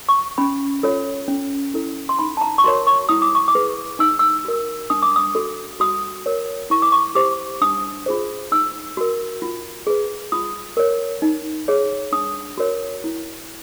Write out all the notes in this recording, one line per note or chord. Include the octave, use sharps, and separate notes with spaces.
C#6
C#4 B5
F4 A4 C#5
C#4
E4 A4
C6
D#4 B5
A5
A#5
C#6
F#4 A#4 C#5 C6
C#6
E4 D#6
D6
C#6
D6
G#4 B4
D#4 E6
E6
F#4 A#4
D4 D#6
D6
D#6
F#4 A4
F#4 D#6
A#4 C#5
E4 C#6
D6
C#6
G4 C5 D6
D4 D#6
F4 G#4 C5
D#4 E6
F#4 A#4
F4
G#4 B4
F4 D#6
A#4 C#5
D#4
G#4 C#5
D4 D#6
F#4 A#4 C#5
E4